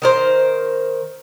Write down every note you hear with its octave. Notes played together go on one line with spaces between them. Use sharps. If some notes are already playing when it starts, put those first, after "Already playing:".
D#3 A#4 C5